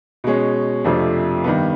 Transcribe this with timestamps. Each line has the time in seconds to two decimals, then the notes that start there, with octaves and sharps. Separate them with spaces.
0.24 B2 G#3 C#4
0.84 F2 C3 F3 A3 D4
1.44 G2 D#3 G3 B3